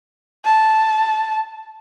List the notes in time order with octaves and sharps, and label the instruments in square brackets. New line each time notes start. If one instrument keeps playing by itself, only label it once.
[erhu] A5